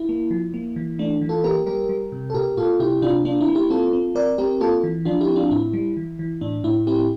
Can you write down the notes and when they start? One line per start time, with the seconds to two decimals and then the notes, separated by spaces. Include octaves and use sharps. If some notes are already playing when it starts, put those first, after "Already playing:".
Already playing: E4
0.09 A#3
0.31 F3
0.54 A#3
0.76 E3
0.99 A3 D4
1.21 E3
1.29 F4 A4
1.44 A#3 G4 A#4
1.66 G3 G4 A#4
1.89 G3
2.12 C3
2.30 A4
2.34 A#2 G4 A#4
2.57 A#2 F4 A4
2.80 C3 E4 G4
3.02 C3 D4 F4
3.25 A#3 D4 F4
3.41 E4
3.48 A#3
3.55 E4 G4
3.70 C4 F4 A4
3.93 C4
4.15 C4 A#4 D5
4.38 C4 G4 A#4
4.61 A#3 F4 A4
4.83 E3
5.05 F3 D4 F4
5.21 E4 G4
5.28 C4
5.36 D4 F4
5.51 A2 E4
5.73 G3
5.97 E3
6.19 E3
6.41 A2 D4
6.64 A2 E4
6.87 C4 E4 G4